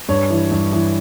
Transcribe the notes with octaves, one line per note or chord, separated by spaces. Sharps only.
G2 C#5
E3
G2
E3